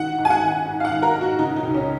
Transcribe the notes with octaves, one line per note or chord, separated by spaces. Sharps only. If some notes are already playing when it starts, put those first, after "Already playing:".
Already playing: D#3 F#5
G#2
G#5
F#5
D#3
G#2
F5
F#5
D#3
A#4
G#2
F#4
C#3 D#4
D#4
C#2
C#4